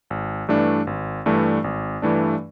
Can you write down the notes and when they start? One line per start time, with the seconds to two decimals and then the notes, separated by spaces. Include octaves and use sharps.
0.10 G#1
0.48 G2 E3 A3 D4
0.87 G#1
1.26 G2 E3 A3 D4
1.64 G#1
2.02 G2 E3 A3 D4